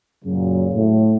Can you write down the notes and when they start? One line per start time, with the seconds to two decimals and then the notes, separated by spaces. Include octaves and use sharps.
0.25 F#2 A#2 C#3 F#3
0.74 A2